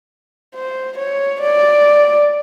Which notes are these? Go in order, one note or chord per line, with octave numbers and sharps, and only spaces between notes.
C5
C#5
D5